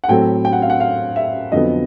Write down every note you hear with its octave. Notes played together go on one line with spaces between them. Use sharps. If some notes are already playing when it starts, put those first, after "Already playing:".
F#5
A2 F#3 A3 C4 G5
G5
F#5
F5
F#5
F5
E5
F2 D3 F#3 B3 D#5